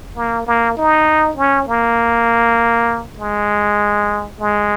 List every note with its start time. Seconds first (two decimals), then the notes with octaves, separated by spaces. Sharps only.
0.17 A#3
0.47 A#3
0.77 D#4
1.37 C#4
1.67 A#3
3.19 G#3
4.39 G#3